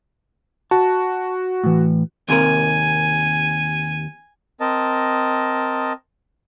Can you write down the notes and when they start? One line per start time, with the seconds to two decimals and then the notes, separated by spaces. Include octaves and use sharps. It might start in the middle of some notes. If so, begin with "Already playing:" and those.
0.71 F#4 A5
1.64 A2 E3
2.29 D#2 C3 A#4 G#5
4.60 C4 A#4 D#5 A5